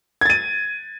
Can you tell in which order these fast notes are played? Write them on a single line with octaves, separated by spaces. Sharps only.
G#6 A6 D#7